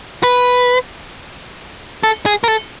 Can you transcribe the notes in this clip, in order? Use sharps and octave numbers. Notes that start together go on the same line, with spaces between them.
B4
A4
G#4
A#4
A4